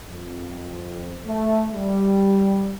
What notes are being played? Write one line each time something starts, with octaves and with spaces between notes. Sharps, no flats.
F2
A3
G3